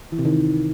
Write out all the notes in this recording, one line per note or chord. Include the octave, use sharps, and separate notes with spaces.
E3
C3
D#3